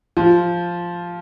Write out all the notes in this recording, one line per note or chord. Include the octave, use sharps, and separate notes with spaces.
F3